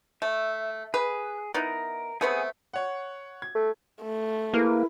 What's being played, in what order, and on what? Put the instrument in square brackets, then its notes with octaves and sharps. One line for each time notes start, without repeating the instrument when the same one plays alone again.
[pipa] A3 [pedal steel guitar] E5
[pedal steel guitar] G#4 [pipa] B4
[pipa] B3 D#4 E4 [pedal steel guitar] A#4
[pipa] A3 B3 C4 [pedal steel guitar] G#4 F#5 G#5
[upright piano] C#5 F#5
G#6
[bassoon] A3
[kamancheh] A3
[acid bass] A#3 [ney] E4 [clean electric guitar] G#4 A#4 B4